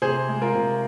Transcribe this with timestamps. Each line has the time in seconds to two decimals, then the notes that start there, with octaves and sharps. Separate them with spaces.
0.02 C3 G#4 C5
0.29 G#3
0.42 F4 A#4
0.55 C3